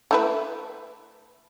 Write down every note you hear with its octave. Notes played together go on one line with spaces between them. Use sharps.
A3 E4 B4